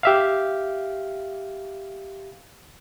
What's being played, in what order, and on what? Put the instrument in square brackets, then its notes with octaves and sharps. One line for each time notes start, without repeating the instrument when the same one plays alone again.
[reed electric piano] G4 E5 F5